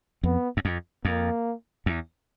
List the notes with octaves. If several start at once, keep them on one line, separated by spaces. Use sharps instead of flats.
F2 B3
F#2
F2
F2 A#3
E2